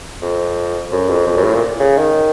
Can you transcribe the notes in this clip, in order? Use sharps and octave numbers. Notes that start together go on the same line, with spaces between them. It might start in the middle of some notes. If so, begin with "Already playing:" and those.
F2
F#2
F2
F2
F#2
A2
A#2
C#3
D#3